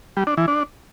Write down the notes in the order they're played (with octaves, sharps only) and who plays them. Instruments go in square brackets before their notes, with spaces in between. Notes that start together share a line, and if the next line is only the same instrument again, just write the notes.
[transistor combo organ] G3
D4
E3
D4